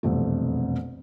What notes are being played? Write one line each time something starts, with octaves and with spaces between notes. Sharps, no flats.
E1 C2 F2 A3